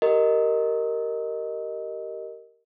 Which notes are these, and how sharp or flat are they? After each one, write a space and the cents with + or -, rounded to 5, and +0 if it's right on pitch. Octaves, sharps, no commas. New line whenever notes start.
G4 -15 A#4 -10 D#5 +0